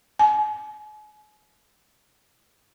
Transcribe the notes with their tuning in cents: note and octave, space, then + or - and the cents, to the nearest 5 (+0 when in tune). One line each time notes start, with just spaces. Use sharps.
G#5 +40